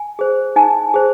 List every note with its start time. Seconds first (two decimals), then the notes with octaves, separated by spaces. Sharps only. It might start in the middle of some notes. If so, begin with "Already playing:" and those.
Already playing: G#5
0.19 G#4 C5
0.56 D#4 G#5
0.94 G#4 C5